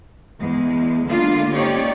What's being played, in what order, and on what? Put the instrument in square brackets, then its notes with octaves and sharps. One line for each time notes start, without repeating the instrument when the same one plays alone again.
[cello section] E2 G#3
D3 G#3 A#3 D4 F4
C#4 D#4 G4 C#5 D5